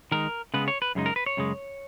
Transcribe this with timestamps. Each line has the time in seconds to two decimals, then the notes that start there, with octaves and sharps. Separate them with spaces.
0.12 D#3 G#3 D#4 A#4
0.54 C#3 G#3 B3 B4
0.68 C#5
0.82 B4
0.95 F#2 C#3 G#3 D#4
1.06 A#4
1.16 B4
1.26 C#5
1.37 F#2 C#3 G#3